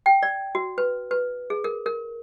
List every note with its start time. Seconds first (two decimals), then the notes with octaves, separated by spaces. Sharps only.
0.06 G5
0.23 D5
0.55 F#4
0.78 B4
1.11 B4
1.50 G#4
1.64 A#4
1.86 A#4